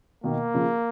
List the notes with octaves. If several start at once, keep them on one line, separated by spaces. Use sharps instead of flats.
B2 D#3 A#3
C#3 F3